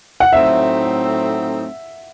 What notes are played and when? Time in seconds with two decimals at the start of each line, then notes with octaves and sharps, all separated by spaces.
0.20 F#5
0.32 A2 F#3 A3 C4 D#4 E5